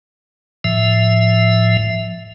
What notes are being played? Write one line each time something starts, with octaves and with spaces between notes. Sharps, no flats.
A2 F3 E5